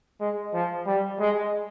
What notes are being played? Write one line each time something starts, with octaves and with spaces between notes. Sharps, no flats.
G#3
F3
G3
G#3